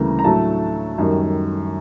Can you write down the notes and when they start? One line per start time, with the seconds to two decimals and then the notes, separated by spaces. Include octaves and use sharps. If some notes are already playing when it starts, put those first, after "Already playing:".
Already playing: D2 C#3 E3 G3 A#3 A#5
0.19 A#5
0.24 A2 F#3 A3 D4 A5
0.98 F#2 D#3 G3